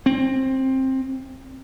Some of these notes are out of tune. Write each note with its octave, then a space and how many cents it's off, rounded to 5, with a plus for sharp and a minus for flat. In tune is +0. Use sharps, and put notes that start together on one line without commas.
C4 +15